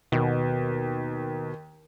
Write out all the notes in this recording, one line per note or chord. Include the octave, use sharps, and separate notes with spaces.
D#2 B2